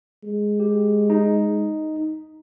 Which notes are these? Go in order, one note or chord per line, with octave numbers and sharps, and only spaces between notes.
G#3
G4
D#4